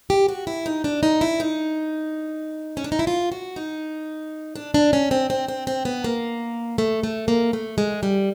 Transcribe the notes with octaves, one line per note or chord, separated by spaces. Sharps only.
G4
F#4
E4
D#4
D4
D#4
E4
D#4
C#4
D4
D#4
E4
F4
F#4
D#4
D4
D4
C#4
C4
C4
C4
C4
B3
A#3
A3
A3
A#3
A3
G#3
G3